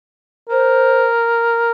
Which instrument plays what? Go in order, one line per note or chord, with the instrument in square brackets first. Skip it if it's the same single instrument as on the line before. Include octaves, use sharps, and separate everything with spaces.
[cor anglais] A#4 [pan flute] C5